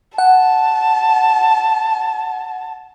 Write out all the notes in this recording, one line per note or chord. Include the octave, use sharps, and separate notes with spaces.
F#5 A5